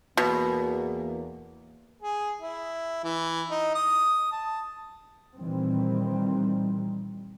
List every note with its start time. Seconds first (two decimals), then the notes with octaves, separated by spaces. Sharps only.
0.17 E2 B2 A#3
2.02 G#4
2.42 E4
3.04 E3
3.51 D#4
3.75 D#6
4.32 A5
5.37 A#2 D#3 E3 G3 C4